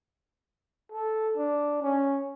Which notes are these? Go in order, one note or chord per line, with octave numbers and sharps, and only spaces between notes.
A4
D4
C#4